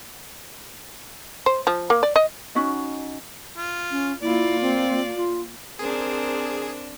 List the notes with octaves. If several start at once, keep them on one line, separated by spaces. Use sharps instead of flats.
C5
F3
A#3
D5
D#5
C#4 D#4 F#4 D#5
F4
C#4
A#3 E4 F4 D5
C4
F4
C4 D4 G#4 A#4 C5